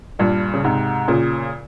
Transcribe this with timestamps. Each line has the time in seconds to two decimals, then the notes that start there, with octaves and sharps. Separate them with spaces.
0.19 G2 A#2
0.54 C#3
0.64 G#2 C3
1.08 A#2 C#3